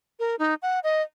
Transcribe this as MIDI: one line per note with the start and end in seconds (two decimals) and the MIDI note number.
0.19 0.35 70
0.39 0.54 63
0.62 0.79 78
0.83 1.02 75